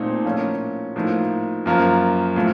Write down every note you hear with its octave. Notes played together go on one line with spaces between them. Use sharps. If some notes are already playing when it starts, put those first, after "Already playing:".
Already playing: A#2 A3 C4 D#4
A2 F3 A#3 C#4
A2 F3 A#3 D#4
F#2 F3 A#3
A2 F3 A3